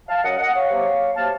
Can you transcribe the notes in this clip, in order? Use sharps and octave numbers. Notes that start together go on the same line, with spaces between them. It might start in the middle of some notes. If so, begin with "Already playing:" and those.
F5 A5
F#2 C#3 F#3 D#5 F#5
D#5 F#5
C#5 F5
C3 F#3 A#3
C3 F#3 A#3 F5 A5